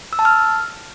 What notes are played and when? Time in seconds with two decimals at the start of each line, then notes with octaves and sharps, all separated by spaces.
0.13 E6
0.19 A5
0.25 F6